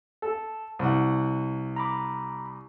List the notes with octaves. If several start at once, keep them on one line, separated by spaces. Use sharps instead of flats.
A4
C2 F#5
A#5 B5 D6